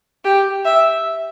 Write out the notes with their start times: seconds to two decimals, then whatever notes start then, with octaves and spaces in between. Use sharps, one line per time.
0.24 G4
0.65 E5